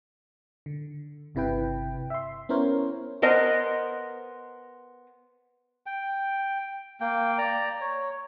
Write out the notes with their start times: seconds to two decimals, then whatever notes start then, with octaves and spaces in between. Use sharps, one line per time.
0.66 D3
1.35 G1 C3 E4 B4 G5
2.10 E5 C6
2.49 B3 C#4 E4 A#4 C5 C#5
3.22 B3 A#4 C5 D#5 A#5
5.86 G5
7.01 A#3 G5
7.38 D5 A#5
7.81 C#5